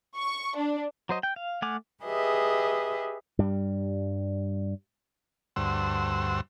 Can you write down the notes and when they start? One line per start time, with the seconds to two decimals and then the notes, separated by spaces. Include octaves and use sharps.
0.17 C#6
0.56 D4
1.09 F#3 C5 D#5
1.23 G5
1.36 F5
1.62 A3 F#5 G#5 D6 F6
2.04 G4 G#4 B4 D#5 E5
3.39 G2 G3
5.56 D2 G2 C5 F#5 E6